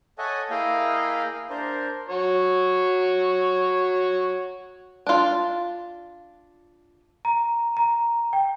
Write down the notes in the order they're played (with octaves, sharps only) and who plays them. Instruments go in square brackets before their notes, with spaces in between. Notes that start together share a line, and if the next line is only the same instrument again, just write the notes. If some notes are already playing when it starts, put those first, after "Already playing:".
[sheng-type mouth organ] A4 C#5 D#5 E5 F#5 G#5
A#3 E4 G#4 D#5 F5 G5
D4 A#4 C5
[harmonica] F#4 C#5
[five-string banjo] D4 F4
[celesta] A#5
A#5
G5